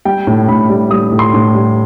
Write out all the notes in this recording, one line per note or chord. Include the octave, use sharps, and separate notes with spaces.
G3 G5
A2
A2 B5
G3
G3 D#6
A2
C6
A2
G3